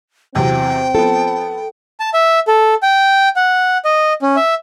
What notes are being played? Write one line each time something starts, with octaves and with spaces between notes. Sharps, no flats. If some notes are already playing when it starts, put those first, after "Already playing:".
E2 C3 F#3 C4 G5
F3 B3 A4
A5
E5
A4
G5
F#5
D#5
C#4
E5